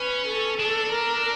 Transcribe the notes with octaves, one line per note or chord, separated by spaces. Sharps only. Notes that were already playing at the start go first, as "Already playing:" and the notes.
Already playing: C#4 B4
A4
D4 A4
A#4